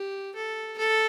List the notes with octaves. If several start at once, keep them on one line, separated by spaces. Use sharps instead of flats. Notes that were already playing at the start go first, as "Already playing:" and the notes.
Already playing: G4
A4
A4